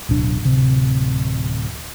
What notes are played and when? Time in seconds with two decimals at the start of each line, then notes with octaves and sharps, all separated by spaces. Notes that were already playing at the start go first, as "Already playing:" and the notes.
0.09 D1 B1 D4
0.43 D1 C3